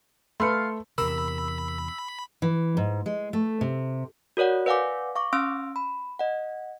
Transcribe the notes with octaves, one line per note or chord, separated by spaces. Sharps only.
A3 F4 B4 F5 B5 C6 C#7
E2 C3 A#4 B5 E6
E3
G#2
G#3
A3
C3
F#4 A#4 C#5 D5 F#5
B4 D5 F5 F#5 G#5 D6
F5 C#6 D6
C#4 F5 C6 E6 F6 D7
B5
D#5 F#5